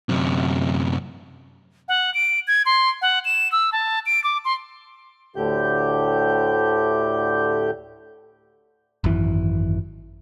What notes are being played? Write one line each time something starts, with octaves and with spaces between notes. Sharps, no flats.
F#2 C3
F#5
D7
G#6
C6
F#5
E7
E6
A5
D7
D6
C6
D2 A2 D3 G4 G6
G#1 F#2 E3